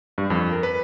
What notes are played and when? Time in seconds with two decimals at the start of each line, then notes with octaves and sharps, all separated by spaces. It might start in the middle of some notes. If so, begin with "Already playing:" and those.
0.18 G2
0.30 F2
0.51 A#4
0.63 B4